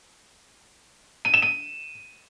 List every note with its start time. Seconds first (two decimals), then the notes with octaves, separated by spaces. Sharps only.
1.25 D#7
1.34 E7
1.42 D#7